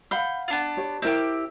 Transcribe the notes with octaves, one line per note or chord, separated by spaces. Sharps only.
F5 F#5 B5 G6
B3 D4 F4
G4 C#5
C4 E4 G4 A#4 E5